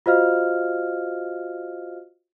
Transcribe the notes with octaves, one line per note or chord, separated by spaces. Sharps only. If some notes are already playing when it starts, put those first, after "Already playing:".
F4 F#4 C5 D#5 F5 F6